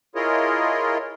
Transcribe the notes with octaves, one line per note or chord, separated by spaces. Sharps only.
E4 F4 G#4 A#4 C#5 D#5